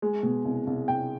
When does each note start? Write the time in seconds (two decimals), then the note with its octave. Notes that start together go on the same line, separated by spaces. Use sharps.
0.02 G#3
0.23 B2
0.45 C2
0.67 C2
0.88 C2 G5